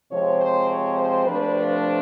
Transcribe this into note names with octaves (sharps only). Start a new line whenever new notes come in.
C3 F3 G#3 C4 C#5
C5
C#5
C5
C3 F3 A3 D4 B4
B4